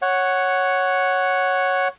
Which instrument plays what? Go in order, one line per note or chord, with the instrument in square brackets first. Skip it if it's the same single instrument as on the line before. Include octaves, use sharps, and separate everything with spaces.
[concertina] C#5 F#5